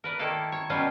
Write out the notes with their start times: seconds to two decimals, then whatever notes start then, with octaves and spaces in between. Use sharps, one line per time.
0.04 A#4 B4 D5
0.19 D#3 A#3 D#4 E4 A4 F5
0.52 C#5
0.70 B2 F#3 G3 C#4 F4